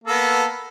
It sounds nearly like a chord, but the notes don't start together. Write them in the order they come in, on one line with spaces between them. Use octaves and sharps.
A#3 A4 B3